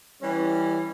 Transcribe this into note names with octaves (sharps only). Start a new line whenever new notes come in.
E3 G3 C#4